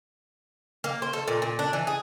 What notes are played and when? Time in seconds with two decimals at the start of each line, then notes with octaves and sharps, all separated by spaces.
0.84 A#3
1.02 C5
1.13 A4
1.28 A#2
1.42 A#2
1.59 D4
1.73 E3
1.87 G#4